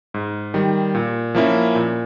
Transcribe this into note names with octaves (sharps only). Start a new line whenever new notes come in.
G#2
D#3 G3
A#2
F3 A#3 C#4 E4
A#2